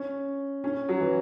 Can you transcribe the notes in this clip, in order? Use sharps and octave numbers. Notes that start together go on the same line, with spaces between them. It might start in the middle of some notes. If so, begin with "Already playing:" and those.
Already playing: C#4
C#4
F#3
E3